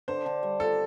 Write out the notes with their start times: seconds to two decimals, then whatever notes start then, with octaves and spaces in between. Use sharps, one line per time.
0.08 D3 C5
0.26 D3
0.43 G3
0.60 F4 A4